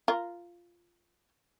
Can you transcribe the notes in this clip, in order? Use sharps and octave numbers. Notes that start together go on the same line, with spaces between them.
F4 A#4